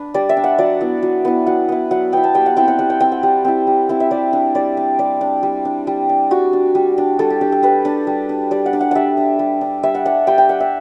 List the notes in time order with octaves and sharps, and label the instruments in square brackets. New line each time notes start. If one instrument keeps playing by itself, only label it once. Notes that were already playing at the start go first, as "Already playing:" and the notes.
Already playing: [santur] D4 B4
G3 D5
E5
D4
F#5
F#3 D5
B3 E4
F#3
B3 E4
F#3 F#5
B3 E4
F#3 F#5
B3 E4 G5
A5
G3 G5
F#5
C4 E4 G5
F#5
G3 F#5
G5
C4 E4 G5
F#5
G3
C4 E4
G3
C4 E4
E5
G3 D5
D4
G3 D5
D4
G3 D5
D4
G3
D4
G3
D4
G3 F#4
D4
G3
D4
G3 A4
G4
D4 G4
A4
G3 B4
D4
G3
D4
G3 D5
F#5
D4
F#5
G3 E5 F#5
D4
G3
D4
G3 E5
F#5
D4 F#5
G3 G5
G5
D4 F#5
E5